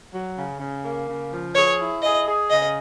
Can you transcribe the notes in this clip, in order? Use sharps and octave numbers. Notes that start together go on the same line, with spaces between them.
F#3
C#3
C#3
A#3
C#3
F3
G#4 C#5
E4
G#4 D#5
G#4
C#3 D#5